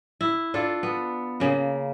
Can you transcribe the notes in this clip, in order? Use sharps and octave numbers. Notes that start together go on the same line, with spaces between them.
E4
D4 F4 A4
B3
C#3 A#3